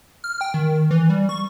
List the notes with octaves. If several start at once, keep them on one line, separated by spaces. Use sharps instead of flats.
F6
G5
D#3
E3
G3
C#6